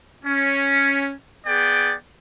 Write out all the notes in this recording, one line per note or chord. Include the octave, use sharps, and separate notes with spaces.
C#4
B3 G#4 D5 G5